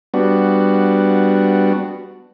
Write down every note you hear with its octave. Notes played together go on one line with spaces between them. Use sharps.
G3 B3 D4 F#4